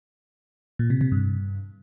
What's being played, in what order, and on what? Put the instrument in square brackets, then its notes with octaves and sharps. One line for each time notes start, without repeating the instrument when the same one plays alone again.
[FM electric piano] A#2
C3
C3
G2